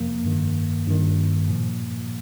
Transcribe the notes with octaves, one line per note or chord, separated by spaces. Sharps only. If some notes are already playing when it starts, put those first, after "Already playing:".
Already playing: F2 C3 F3 A#3
G2 D#3
G2 D#3
A#2 F3